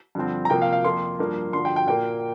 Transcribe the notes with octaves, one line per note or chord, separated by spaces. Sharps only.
G2 D3 F3 C4
A#5
C3 F3 A#3 G5
F5
F5
F2 F3 A#3 C6
G2 F3 A#3
G2 D3 F3 C6
G5
G5
A#2 A#3 G5